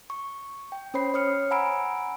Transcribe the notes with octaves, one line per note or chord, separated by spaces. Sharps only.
C#6
G5
C#4 C5 C#5 B5 C7
C#5 D#6 F6 C#7
F#5 G#5 A#5 B5 E6 D7